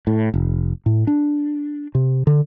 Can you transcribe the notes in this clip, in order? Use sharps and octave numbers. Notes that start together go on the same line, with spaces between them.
A2
F1
A2
D4
C3
D3